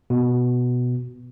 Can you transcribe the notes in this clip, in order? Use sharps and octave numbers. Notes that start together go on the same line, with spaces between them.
B2